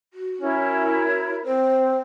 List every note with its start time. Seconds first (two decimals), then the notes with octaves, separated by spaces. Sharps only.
0.14 F#4
0.41 C#4 E4 A#4 C#5
1.44 C4 C5